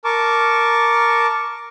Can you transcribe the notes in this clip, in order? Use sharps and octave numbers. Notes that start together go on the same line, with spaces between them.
A#4 A5 C#6 D6